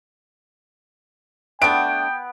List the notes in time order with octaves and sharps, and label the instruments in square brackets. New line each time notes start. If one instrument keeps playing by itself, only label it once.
[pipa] A3 D4 [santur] B3 [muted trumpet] G5 [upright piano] D7